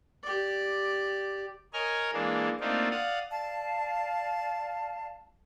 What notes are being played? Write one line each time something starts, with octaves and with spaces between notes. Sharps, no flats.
G4 D5
A#4 C#5 D#5 G#5 F6
E3 G#3 A#3 D4
A3 A#3 C4 D4 D#4 F4
D5 F5 F#5 D#6
D5 F5 A5